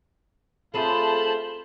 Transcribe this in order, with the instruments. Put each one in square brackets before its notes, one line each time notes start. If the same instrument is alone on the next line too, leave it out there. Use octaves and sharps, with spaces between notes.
[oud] A3 C4 G#4 [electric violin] F4 C5 [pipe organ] A5 B5